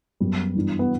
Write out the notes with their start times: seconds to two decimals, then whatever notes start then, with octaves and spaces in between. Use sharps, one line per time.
0.20 F#2 F#3 G3 B3
0.55 G2 E3 B3 D4
0.79 B3